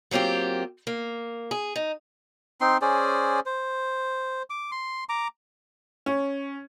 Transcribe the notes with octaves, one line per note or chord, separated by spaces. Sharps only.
F#3 A#3 C4 F4 G4
A#3
G#4
D#4
C4 D#4 C6
C#4 G#4 C5 D5
C5
D6
C6
A#5 D6
C#4